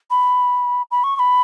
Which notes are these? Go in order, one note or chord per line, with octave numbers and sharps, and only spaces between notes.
B5
B5
C#6
C#6
B5